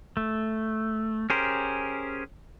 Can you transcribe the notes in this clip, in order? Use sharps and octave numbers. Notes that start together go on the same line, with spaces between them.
A3
C#4 G4 G#4 A#4 C5